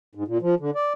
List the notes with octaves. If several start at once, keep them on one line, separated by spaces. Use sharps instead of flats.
G#2
A#2
F3
D3
D5